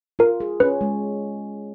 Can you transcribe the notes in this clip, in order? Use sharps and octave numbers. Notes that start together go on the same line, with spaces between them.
F4 A#4
G#4
C#4 B4
G#3